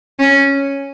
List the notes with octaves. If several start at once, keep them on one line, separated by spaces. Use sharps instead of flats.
C#4